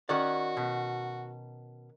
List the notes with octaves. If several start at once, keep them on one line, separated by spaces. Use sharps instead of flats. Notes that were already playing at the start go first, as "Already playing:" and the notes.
D#3 C#4 F#4 D5 F#5
B2